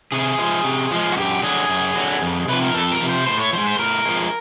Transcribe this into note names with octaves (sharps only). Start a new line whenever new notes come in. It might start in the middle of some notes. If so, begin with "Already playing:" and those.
C3 G#4
F3 G#3
C3
F3 G#3
F#4
F#2 G4
D3 F#3 G#4
F#2
D3 F#3
F2
C3 F3 B4
A#4
F2 A4
A#4
C3 F3
C5
A2 C5
C#5
F3 C5
G#3
C5
A2 A#4
F3 G#3